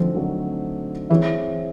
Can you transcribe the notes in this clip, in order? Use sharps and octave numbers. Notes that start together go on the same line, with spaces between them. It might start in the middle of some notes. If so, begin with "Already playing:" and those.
Already playing: D3 F3 F#3 A3 C4 D#4
D3 F#3 A3 C4 D#4
E3 C4 E4 G#4 C#5 E5